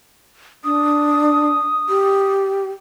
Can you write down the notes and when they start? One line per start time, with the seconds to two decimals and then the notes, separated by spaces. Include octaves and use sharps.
0.64 D4 D#6
1.89 G4